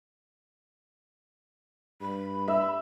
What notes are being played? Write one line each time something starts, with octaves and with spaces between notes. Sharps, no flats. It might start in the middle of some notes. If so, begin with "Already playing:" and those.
G2 B5
E5 E6